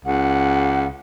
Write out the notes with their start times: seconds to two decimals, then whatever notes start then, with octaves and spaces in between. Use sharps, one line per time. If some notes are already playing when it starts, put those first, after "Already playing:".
0.05 C#2 F#5